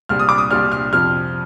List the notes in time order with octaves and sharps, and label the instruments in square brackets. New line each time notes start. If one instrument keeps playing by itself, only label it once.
[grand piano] C2 A#2 G3 D4 [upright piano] F6
[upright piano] D#6
D6
D#6
[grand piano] C2 A#2 G3 D4 [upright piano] F6
[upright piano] F6
[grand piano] F2 C3 F3 [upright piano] F6